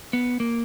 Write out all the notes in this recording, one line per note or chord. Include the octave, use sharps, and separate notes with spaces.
B3
A#3